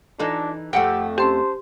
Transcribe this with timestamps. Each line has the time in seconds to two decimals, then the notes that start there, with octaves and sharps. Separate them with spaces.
0.19 E3 D4 D#4 F4 A4
0.73 F2 A3 G4 C5 F#5 G5
1.18 C#4 G4 C5 A5 C6